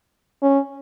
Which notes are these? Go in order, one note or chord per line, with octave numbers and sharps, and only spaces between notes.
C#4